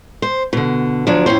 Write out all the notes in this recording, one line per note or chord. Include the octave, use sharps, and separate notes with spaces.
C5
B2 D3
D2 F3 F#3 D4
F2 A2 C#4 C5